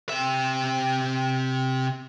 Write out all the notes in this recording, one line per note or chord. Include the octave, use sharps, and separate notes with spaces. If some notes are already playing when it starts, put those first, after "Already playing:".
C3 E5